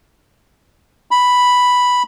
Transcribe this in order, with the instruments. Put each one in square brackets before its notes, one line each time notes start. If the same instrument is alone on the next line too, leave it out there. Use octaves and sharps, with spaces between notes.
[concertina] B5